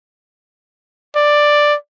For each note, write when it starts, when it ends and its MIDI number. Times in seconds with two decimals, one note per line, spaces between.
1.16 1.75 74